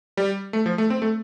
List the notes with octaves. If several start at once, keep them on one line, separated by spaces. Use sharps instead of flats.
G3
A3
F3
A3
C4
A3